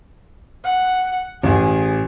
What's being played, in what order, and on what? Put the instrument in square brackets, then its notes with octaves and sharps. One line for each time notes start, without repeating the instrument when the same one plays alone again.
[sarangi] F#5
[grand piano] A1 [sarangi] G#4